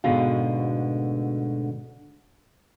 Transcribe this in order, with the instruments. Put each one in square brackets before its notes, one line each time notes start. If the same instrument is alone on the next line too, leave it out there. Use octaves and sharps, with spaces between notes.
[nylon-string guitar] D2 G#2 B2 D3 A4 F5